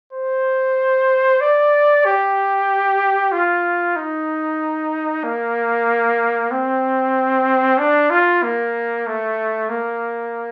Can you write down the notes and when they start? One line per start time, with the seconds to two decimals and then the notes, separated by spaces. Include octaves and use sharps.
0.13 C5
1.41 D5
2.05 G4
3.32 F4
3.96 D#4
5.24 A#3
6.52 C4
7.78 D4
8.10 F4
8.43 A#3
9.07 A3
9.70 A#3